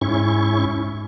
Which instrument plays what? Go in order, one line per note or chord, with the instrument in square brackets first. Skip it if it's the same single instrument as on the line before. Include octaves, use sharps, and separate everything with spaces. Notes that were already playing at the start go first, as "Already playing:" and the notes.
[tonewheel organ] G#2 C#4 E4 C#6